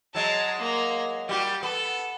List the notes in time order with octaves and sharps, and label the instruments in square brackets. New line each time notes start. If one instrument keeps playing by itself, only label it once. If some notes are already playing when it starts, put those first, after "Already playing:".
[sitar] F#3 G#3 [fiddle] A5 A#5
[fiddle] A#3 A#5
[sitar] G3 A#3 F#4 [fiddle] G4
[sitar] B3 [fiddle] A4